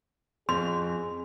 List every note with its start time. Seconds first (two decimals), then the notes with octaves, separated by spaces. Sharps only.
0.49 F2 G#4 C6